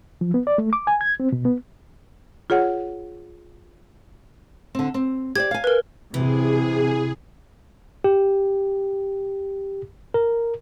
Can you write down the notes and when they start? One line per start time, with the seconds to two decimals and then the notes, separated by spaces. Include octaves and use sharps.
0.21 F3
0.34 B3
0.47 D5
0.58 A3
0.73 D6
0.87 G#5
1.01 G#6
1.20 C4
1.32 B2
1.45 B3
2.50 F4 G#4 C#5 F#5
4.75 D3 C4
4.94 C4
5.36 G4 C5 D5 G#6
5.51 F5 G#5
5.64 A#4 B4
6.14 C3 E3 G#4
8.04 G4
10.14 A#4